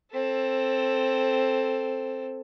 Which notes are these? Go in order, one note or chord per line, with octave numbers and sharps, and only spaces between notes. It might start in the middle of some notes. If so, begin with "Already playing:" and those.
C4 A4